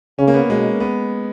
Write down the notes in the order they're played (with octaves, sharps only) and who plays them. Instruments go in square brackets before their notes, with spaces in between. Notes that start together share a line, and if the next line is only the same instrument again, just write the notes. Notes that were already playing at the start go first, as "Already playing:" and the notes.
[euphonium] C#3 [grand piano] C#4
[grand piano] A#3
B3
[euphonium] B2 [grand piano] G#3
[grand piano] B3